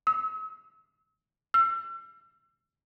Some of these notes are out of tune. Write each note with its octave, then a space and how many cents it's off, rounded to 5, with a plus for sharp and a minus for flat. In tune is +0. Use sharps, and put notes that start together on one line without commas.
E6 -45
E6 +35